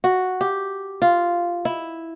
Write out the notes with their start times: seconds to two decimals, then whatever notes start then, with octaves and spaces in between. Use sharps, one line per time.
0.04 F#4
0.41 G4
1.02 F4
1.65 E4